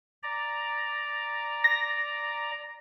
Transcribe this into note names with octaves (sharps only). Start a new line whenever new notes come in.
D5 A#5
A#6